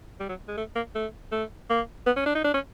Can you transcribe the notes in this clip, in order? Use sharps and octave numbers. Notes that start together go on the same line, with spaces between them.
G3
F#3
G#3
A3
A#3
A3
A3
A#3
B3
C#4
D4
D#4
D4
C#4